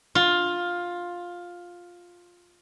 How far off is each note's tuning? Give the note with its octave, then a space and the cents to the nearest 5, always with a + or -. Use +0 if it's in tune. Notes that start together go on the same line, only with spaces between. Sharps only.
F4 +10